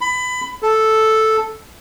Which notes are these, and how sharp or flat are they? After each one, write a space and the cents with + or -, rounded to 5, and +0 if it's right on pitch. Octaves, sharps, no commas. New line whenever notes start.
B5 +25
A4 -5